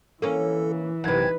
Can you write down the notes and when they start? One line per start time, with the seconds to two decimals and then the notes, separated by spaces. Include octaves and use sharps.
0.22 E3 A#3 C#4 A4
1.04 A1 F#2 C3 D#4 B4 G#6